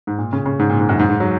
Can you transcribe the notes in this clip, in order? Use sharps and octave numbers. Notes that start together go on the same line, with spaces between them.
G#2
A#2
C#3
C#3
G#2
A#2
G#2
F#2
G#2
G#2
F#3